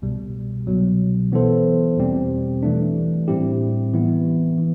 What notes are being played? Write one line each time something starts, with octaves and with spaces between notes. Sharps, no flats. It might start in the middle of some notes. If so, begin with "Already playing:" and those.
C2 B2 G3
C2 B2 F#3
E3 B3 E4 A4 C5
E2 B2 G3 C4 G4
E3 A3 D4
A2 G3 C4 E4 G4
E3 B3 E4
E3